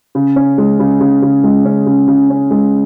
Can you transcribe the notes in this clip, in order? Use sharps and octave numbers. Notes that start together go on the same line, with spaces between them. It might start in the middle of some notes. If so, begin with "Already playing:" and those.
C#3
C#4
G#3
C#3
C#3
C#3
G#3
C#4
C#3
C#3
C#4
G#3